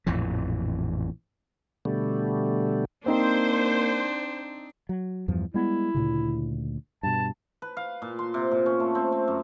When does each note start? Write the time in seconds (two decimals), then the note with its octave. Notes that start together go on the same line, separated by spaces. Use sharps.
0.06 A1 F2 A#2 E3
1.85 B2 D3 G3 A3
3.06 A#3 C4 D4 D#4 C5 G5
4.89 F#3
5.28 E2 G2 F3
5.54 G3 G#3 B3 E4
5.94 D2 A#2 C#3
7.03 G2 B2 A5
7.62 B4
7.77 F5
8.02 A#2
8.19 C6
8.34 C3
8.51 A#2
8.66 C#4
8.80 A3
8.95 C4
9.12 C4
9.28 F#2